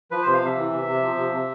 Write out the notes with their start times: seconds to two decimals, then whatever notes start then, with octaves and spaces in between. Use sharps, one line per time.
0.11 F3 B4
0.22 C3 C5
0.34 F5
0.41 C3 E5
0.57 E3
0.71 C3
0.87 C3
1.02 F3
1.17 C3
1.33 C3